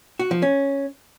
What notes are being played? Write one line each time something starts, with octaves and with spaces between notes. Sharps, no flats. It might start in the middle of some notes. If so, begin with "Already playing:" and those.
F#4
F3
C#4